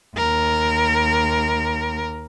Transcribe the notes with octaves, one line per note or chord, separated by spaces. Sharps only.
D#2 A#4